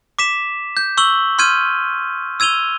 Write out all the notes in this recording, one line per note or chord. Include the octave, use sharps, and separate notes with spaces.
D6 B6 E7
G6
C#6 E6 F#7 G7
C6 F6 G6 G#6 D#7
E6 G#6 D#7 F7 G7